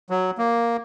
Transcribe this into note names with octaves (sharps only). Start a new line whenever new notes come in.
F#3
A#3